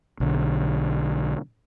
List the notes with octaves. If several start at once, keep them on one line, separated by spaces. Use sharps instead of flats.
B1 D3